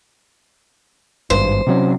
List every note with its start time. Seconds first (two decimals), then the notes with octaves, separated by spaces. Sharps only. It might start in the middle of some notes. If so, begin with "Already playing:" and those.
1.30 G#1 G2 C5
1.67 C3 F#3 C#4